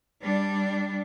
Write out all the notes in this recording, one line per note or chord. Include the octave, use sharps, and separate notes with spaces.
G3 D4